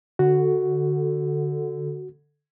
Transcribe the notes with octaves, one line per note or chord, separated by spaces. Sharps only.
D3 F#4